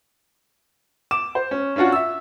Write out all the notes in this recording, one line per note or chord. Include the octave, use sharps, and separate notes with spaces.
D6 E7
C5
C#4
C#4 D4 F4 F#4 F#5
E5 E6